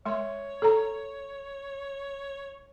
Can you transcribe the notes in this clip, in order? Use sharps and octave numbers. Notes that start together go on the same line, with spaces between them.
G#3 C#5 C6
A4 A#5